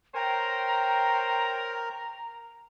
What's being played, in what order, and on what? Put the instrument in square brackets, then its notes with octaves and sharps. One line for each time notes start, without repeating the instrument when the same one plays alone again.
[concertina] A#4 [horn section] C5 C#5 G5 [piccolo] A#5